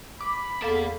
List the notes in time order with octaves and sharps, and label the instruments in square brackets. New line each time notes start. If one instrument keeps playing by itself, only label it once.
[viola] B5 [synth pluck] D6
[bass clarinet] E2 [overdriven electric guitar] A#3 F5 [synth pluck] A4